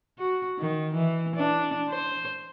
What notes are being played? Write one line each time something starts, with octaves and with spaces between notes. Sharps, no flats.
F#4
D#3
E3
D4
C5